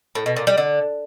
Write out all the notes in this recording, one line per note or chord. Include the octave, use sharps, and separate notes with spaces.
A2
B2
A#2
G3
D3